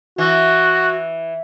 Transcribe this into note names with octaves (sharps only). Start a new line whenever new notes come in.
E3 F#4